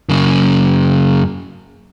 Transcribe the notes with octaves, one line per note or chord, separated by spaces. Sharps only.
F#2 C#3